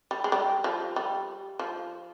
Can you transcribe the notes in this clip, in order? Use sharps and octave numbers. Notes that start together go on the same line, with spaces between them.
G3
G#3
G3
F3
G3
F3